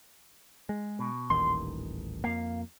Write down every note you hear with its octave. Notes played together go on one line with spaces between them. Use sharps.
G#3
B2
D#1 A1 D#3 C6
F2 A#3 F5